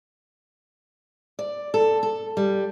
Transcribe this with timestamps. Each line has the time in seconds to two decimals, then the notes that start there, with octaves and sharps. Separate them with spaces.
1.39 D5
1.74 A4
2.03 A4
2.37 G3